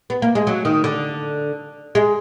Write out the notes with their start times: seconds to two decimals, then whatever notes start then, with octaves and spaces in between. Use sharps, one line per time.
0.10 B3
0.22 A#3
0.35 G#3
0.47 F#3
0.65 D#3
0.84 D3
1.95 G#3